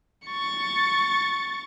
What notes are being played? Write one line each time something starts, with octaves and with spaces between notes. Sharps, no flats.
C#6 A6